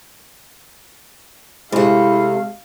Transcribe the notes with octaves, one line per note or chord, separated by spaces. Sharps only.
C3 G#3 A3 E4 F5